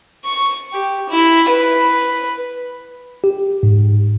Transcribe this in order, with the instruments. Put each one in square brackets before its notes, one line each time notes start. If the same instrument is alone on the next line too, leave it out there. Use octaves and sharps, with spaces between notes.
[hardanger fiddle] C#6
G4
E4
B4
[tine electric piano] G4
G#2